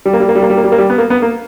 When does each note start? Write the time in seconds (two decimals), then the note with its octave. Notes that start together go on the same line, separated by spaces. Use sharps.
0.06 G3
0.13 A#3
0.20 G3
0.28 A#3
0.35 G3
0.42 A#3
0.50 G3
0.57 A#3
0.64 G3
0.72 A#3
0.78 G3
0.90 B3
0.98 A#3
1.10 B3
1.22 A#3